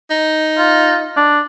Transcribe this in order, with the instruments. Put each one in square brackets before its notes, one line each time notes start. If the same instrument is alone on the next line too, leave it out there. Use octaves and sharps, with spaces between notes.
[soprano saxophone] D#4
[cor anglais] F4
D4